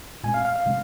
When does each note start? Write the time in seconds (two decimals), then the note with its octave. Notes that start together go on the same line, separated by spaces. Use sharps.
0.23 A#2 G#3 C4 G#5
0.34 F5
0.45 F5
0.56 F5
0.66 C3 G#3 C4